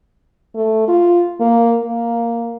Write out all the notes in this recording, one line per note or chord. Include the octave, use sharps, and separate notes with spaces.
A3
F4
A#3
A#3